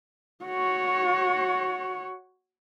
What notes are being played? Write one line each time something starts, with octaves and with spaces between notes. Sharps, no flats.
F#4 C#5